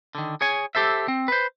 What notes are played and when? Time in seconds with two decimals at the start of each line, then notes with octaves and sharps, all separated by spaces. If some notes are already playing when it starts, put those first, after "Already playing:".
0.15 D3 D#3
0.41 G#4 C#5 G#5
0.75 G4 A4 C5 E5
1.08 C4
1.28 B4 C5